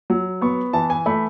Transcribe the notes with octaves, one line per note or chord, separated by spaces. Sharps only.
F#3
B3 C#6
E3 A5
G#5
A3 B5